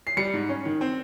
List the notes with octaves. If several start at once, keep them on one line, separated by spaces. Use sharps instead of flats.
C7
G3 C#7
G#2
C#4
D#3
C4